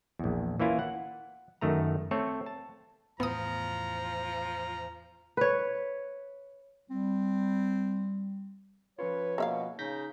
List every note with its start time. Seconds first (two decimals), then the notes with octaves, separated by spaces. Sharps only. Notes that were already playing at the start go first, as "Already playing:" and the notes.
0.19 A#1 E2
0.60 E3 A#3 C#4 E4 F4
0.79 F#5
1.61 F#2 D#3 A3 A#5
2.11 A3 C4 A4 C#5
2.46 A5
3.20 E2 A2 F3 B3 A#5 D#6
5.37 B4 C#5
6.90 G3 C4
8.99 F3 C#4 F4 B4 C#5
9.38 B2 A#3 E5 F5
9.79 C#3 D#4 G6 A#6 B6